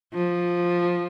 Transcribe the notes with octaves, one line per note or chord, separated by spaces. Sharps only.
F3